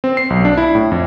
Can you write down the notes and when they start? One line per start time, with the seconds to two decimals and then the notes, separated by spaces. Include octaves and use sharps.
0.04 C4
0.17 C7
0.30 B1
0.45 D4
0.57 E4
0.75 A2
0.91 F2